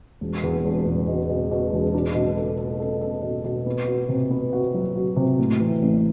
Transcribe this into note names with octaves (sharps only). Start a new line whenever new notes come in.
E1
E2
E1
E1
B2
B2
B2
E1
D4
B2
A4
A4
A4
A4
B2
B2
B3
F#4
C3
B3
F#4
F#3
F#4
C3
A2
E3
A1